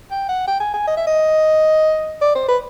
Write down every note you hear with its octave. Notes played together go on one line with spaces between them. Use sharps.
G5
F#5
G5
G#5
G#5
D#5
E5
D#5
D5
C5
B4